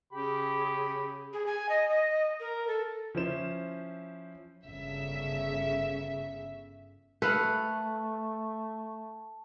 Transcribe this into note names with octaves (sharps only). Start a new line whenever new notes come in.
C#3 G4 G#4 B5
G#4
G#5
D#5
D#5
A#4
A4
F3 C#4 E4 C5 E7
G1 C#3 E5
A3 A4 B4 F5 F#5 A5